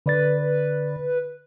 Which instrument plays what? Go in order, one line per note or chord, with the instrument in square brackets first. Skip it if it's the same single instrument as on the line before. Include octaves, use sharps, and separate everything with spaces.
[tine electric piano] D3 D5 A6 [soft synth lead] B4